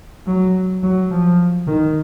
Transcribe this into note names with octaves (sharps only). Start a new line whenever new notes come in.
F#3
F#3
F3
D#3